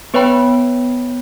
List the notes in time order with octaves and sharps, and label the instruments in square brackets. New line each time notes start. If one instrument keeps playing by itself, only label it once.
[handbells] B3 B4 C#5 G5 B5